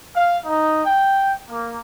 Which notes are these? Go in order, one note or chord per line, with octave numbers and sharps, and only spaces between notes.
F5
D#4
G5
A#3